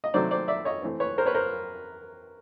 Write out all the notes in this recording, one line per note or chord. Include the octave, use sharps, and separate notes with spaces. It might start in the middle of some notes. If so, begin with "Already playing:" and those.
D#5
C3 D#3 F#3 A3 C5 D5
C5 D5
D5 E5
C#5 D#5
E3 A3 C4
B4 C#5
A#4 C5
B4 C#5
A#4 C5